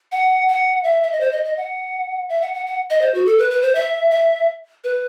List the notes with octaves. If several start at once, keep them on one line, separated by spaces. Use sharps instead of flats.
F#5
F#5
E5
E5
D#5
C5
D#5
D#5
F#5
E5
F#5
F#5
F#5
D#5
C5
F#4
A4
B4
B4
C5
E5
E5
B4